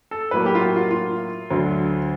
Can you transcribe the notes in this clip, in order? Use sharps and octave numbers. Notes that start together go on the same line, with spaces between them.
A4
A2 F#3 A#3 B4
G4
F4
F#4
F4
F4
D2 D3 F#3